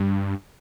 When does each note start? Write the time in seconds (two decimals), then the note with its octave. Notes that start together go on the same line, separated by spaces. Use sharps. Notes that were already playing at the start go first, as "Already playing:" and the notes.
Already playing: G2